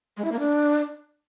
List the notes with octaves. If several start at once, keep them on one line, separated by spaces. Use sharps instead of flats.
G#3
E4
A#3
D4